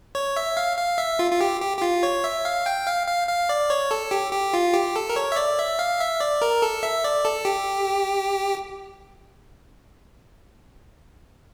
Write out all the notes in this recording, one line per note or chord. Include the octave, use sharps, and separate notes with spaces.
C#5
E5
F5
F5
E5
F4
F4
G4
G4
G4
F4
C#5
E5
F5
G5
F5
F5
F5
D5
C#5
A4
G4
G4
F4
G4
A4
A#4
C#5
E5
D5
E5
F5
E5
D5
A#4
A4
E5
D5
A4
G4